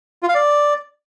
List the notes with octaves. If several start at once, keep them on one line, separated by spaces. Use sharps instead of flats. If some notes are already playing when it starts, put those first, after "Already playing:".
F4
F5
D5